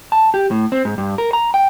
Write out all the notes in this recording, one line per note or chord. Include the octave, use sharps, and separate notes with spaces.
A5
G4
A2
C4
G#2
G2
A#4
A#5
G5